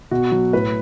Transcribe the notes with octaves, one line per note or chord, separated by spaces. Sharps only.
B2 F#4
F#3
A2 B4